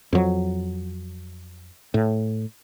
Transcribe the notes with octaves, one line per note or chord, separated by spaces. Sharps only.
F2 F#3
A2